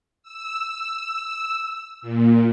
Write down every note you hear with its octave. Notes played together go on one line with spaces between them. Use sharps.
E6
A#2